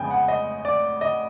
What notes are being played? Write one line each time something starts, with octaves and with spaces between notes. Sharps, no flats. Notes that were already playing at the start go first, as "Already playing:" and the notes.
Already playing: F2 C#3 F3 G#3 B3 G5 G#5
F#5
D#5
D5
D#5